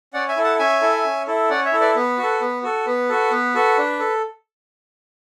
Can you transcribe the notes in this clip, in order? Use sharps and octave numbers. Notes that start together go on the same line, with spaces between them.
C#4 D5 F#5
E5 G#5
E4 A4
F#5 A5
C#4 E5 G#5
E4 A4
C#4
E4 A4
C#4 D5 F#5
C#5 E5
E4 A4
B4 D5
B3 B4
F#4
A4
B3
F#4 A4
B3 B4
F#4 A4
B3
F#4 A4
D4
A4